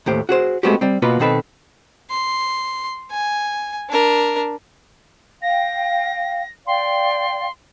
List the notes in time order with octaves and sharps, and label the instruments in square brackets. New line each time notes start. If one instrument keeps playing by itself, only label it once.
[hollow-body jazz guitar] D#2 A2 G4 C5
F#4 G#4 C5
G#3 A3 B3 C4 F#4 G4
G3 C4
B2 A#3 B3 F4 F#4 B4
B2 D#3 C4 A4 B4
[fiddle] C6
G#5
D4 A#4
[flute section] F5 G5 [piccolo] A#6
[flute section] D5 F5 G5 [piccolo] C6